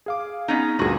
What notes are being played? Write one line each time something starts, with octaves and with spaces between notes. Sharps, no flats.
G#4 F5 D6
B3 C#4 D#4
D2 G2 A#2 F#4 G#4